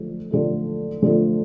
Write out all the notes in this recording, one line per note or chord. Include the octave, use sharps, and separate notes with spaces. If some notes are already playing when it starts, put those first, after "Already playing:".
Already playing: D3 F3 A3
D3 F3 A3
D3 F3 A3